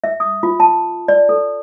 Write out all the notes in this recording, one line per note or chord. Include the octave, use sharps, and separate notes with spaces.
E5
D#6
F4
A5
D5
A4